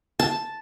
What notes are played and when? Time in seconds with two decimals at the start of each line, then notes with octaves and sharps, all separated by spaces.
0.19 A5